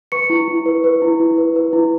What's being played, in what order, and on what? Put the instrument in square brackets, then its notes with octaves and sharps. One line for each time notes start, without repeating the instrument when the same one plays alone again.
[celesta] B4 C#6 C#7
E4
E4
B4
B4
E4
E4
B4
B4
E4